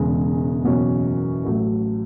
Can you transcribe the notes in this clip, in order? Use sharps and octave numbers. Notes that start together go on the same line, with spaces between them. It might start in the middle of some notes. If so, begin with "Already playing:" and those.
Already playing: E1 E2 C#3 G#3
F#1 E2 B2 F#3 C#4
A1 A2 F#3 A3